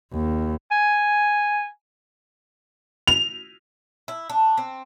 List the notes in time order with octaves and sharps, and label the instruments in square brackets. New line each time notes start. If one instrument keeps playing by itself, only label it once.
[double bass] D#2
[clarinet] G#5
[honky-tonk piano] F7
[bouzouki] E4
D4
C4